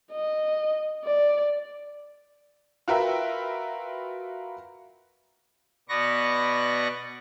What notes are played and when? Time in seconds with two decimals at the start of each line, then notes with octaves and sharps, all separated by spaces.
0.12 D#5
1.05 D5
2.88 F4 F#4 A#4 B4 E5 G5
5.89 B2 B3 B4 D5 C#6 A#6